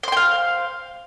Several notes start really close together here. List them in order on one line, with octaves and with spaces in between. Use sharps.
C5 C6 G5 F5